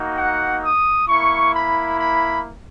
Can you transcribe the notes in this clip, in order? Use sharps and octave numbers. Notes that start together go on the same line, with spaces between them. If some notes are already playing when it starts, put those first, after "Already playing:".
Already playing: A#3 D#4 F#4
F#5
D#6
A#3 E4 C#6
B5
B5